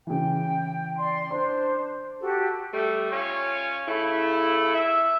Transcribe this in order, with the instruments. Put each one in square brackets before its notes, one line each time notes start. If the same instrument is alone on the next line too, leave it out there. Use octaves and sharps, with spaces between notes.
[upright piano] C#3 E3 [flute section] G5
[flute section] D5 C6
[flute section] D4 C5 [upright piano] C6
[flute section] F#4 G4 A4
[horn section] G3 A3
C#4 F4 C#5
C#3 A3 E4
E5